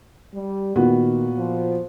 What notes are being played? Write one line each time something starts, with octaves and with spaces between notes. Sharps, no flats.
G3
A#2 D#3 B3 F#4
F3